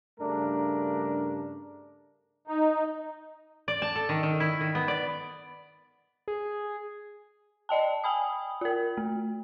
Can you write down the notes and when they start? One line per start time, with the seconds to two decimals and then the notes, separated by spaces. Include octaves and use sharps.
0.20 G2 C#3 A3 D4 A#4
2.47 D#4
3.68 D5
3.82 A5
3.96 A4
4.09 D#3
4.23 D#3
4.40 E4
4.61 D#3
4.75 B3
4.88 D5
6.28 G#4
7.69 D5 D#5 G5 A5
8.04 G5 G#5 B5 D#6
8.61 F4 A#4
8.97 A3